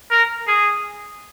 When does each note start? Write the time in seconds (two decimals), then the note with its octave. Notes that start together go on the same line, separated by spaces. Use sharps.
0.11 A#4
0.47 G#4